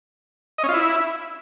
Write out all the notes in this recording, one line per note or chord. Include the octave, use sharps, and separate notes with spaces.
D#5
C#4
F4
E4